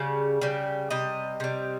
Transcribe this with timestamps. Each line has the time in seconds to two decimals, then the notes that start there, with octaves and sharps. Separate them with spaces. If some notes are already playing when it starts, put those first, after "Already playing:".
Already playing: C#3 G3
0.42 C#3 G3
0.91 C3 G3 D#5
1.40 C3 G3